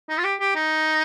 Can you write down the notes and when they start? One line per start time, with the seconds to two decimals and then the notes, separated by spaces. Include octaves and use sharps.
0.09 D#4
0.18 F4
0.24 G4
0.40 G4
0.55 D#4